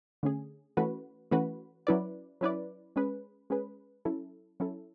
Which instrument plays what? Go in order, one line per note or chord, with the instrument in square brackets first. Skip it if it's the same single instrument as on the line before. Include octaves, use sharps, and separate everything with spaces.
[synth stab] D3 A3 C#4 G#4
E3 A3 C#4 F#4 B4
E3 A3 C#4 F#4 B4
F#3 C#4 E4 B4 D5
F#3 C#4 E4 B4 D5
G#3 C#4 G#4 B4
G#3 C#4 G#4 B4
F#3 C#4 E4 A4
F#3 C#4 E4 A4